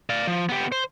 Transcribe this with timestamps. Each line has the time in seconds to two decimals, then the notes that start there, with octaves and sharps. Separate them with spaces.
0.10 D5 F5
0.27 F3
0.49 B3 G4
0.72 C5